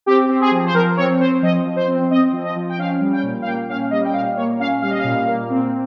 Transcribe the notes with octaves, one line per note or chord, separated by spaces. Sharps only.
C4 G4
C4
G#4
F3
C5
F3 A#4
C4 C#5
C4 C5
F3 D#5
F3
C5
C4
C4 D#5
F3
D#5
F3
G5
C#4 F5
G3
G5
A#2
F5
A#3 G5
C#4 F5
G3 D#5
G5
A#2 F5
A#3 C#5
C#4 F5
G3 F5
D#5
F5
A#2
A#3
C4